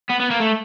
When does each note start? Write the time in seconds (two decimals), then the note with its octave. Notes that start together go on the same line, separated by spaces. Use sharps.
0.09 B3
0.20 B3
0.30 A#3
0.40 A3